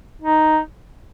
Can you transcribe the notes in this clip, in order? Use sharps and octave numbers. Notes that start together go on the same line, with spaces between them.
D#4